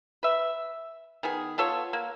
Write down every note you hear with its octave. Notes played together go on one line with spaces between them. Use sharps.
B4 E5
D#3 B3 G#4
B3 F4 A4 C#5
A#3